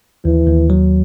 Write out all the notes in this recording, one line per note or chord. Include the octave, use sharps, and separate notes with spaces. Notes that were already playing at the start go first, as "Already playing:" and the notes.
D#2 E3
D#2
F#3